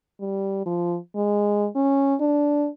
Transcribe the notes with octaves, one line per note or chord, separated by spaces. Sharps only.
G3
F3
G#3
C#4
D4